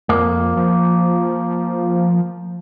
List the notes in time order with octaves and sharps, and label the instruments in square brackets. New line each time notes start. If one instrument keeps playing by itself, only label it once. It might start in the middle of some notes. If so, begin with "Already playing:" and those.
[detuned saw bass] F2 [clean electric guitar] A#3
[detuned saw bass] F3